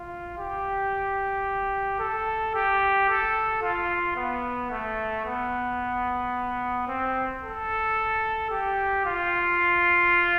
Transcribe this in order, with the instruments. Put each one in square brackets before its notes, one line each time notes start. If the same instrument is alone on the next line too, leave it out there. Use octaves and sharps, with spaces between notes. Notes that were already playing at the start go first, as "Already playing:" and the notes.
Already playing: [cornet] F4
G4
A4
G4
A4
F4
B3
A3
B3
C4
A4
G4
F4